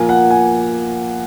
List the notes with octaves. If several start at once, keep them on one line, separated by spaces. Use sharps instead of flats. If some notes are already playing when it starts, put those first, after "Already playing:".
Already playing: A#2 F3 A#3 G#5
F#5
G#5